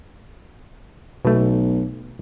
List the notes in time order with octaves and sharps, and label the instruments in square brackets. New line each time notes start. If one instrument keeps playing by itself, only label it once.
[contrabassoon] B1 [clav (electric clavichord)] B2 A3